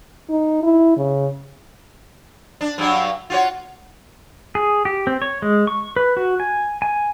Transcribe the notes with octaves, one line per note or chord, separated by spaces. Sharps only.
D#4
E4
C#3
D4
G2 F#3
F4 F#4 C#5
G#4
G4
C4
C#5
G#3
C#6
B4
F#4
G#5
G#5